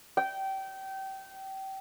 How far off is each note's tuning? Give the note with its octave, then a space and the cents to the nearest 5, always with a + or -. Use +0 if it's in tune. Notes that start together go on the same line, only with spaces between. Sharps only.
G5 -25